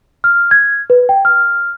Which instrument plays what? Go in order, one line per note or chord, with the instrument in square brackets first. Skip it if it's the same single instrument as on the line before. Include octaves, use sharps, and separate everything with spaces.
[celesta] F6
G#6
B4
G5
F6